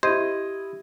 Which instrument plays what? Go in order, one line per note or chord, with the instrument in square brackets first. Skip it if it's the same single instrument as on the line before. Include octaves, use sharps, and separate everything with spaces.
[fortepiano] E4 D#5 [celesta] G4 G#6 D#7 [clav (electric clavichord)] C5